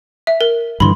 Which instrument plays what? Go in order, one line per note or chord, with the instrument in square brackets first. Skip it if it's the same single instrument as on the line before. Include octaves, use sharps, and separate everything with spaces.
[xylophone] E5
A#4
[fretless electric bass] G2 D3 E3 [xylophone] B5 C6